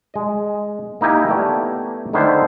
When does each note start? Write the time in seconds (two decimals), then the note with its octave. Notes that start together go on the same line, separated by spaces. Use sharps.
0.14 G#3 D#5
1.01 A#3 D#4 E4 G4 G#5
1.29 A3 B3 E4 G4 D5
2.13 D3 D#3 A3 E4 C5